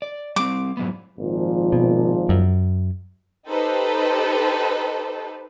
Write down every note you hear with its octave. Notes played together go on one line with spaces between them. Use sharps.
D5
G3 C4 D6
G#2 F#3 B3
G#1 A#2 F3
B2
F#2
D#4 G4 A4 B4 C5